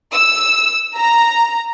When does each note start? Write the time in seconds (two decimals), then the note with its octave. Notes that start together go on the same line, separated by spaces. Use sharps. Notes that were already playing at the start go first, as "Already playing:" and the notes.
0.13 E6
0.96 A#5